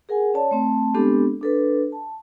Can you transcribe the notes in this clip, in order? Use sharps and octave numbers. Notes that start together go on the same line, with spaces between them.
G#4 A#4 F#5 G#5
C#4 C#5 D5 A5
A3 C4 A5
G#3 B3 C4 D4 G4 A4
D4 A4 B4
A5